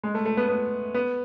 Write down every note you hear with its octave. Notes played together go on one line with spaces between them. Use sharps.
G#3
A3
A3
B3
B3
B3